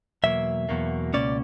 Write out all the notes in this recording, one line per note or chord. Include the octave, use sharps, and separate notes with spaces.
E2 B2 F#3 A#3 E5
E2 B2 F#3 A#3
C#2 B2 A#3 C#4 D5